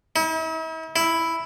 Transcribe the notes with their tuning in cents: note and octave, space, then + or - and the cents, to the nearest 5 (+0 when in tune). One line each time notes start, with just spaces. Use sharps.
E4 -45
E4 +0